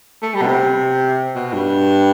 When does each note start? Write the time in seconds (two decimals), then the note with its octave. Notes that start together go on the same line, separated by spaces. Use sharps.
0.22 A3
0.35 G3
0.42 B2
0.47 C3
1.35 B2
1.53 G2